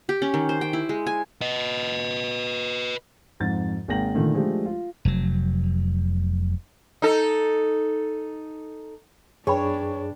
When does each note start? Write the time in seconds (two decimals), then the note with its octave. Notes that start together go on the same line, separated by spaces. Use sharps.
0.09 G4
0.22 C#4
0.34 D#3
0.49 C5
0.61 G5
0.73 E4
0.89 G#3
1.07 G#5
1.41 B4 D#5
3.40 F2 G#2 A6
3.88 G#1 G#3 A#3 G5 A#6 F#7
4.15 A#2 D3 D#3 A3
4.34 F3 G#3 A3 D4 F4 G4
4.66 F4
5.05 F1 F#3
7.02 D#4 A4
9.47 F#2 D4 G#4 B4 C#5 G5 B5